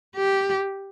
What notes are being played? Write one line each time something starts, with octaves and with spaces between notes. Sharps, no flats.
G4